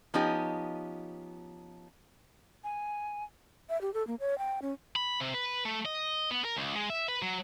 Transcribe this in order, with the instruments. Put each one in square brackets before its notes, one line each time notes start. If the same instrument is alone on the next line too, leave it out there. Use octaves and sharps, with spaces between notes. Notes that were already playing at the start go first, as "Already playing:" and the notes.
[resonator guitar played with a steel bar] F3 B3 C#4 D#4 G4
[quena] G#5
[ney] E5
G4
A4
A#3
C#5
G5
C#4
[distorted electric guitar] B5
C3
B4
A3
D#5
B3
A#4
C#2
G#3
E5
B4
F#3